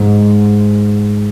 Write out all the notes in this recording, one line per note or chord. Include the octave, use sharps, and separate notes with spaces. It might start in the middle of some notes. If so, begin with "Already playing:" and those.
Already playing: G#2